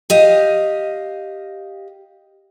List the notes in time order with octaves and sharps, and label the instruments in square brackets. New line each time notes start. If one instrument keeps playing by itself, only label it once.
[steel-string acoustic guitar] G4 D#5 F5